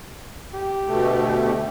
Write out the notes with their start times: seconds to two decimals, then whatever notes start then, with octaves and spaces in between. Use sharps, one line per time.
0.54 G4
0.87 D2 B2 A3